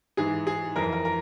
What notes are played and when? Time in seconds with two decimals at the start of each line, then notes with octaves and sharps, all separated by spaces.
0.17 G#2 E3 G#4
0.47 G#4
0.76 F2 E3 A#4
0.92 A#4
1.05 A#4